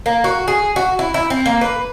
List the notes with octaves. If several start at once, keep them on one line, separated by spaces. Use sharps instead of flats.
A#3
F#4
G#4
F#4
E4
E4
C4
A#3
B4